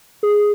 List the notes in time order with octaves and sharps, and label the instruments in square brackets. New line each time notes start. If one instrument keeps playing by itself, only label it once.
[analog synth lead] G#4